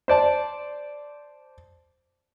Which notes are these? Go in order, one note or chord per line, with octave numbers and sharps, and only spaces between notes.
C5 D5 A5